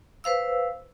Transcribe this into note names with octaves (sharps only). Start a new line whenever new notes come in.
B4 C5 F5 E6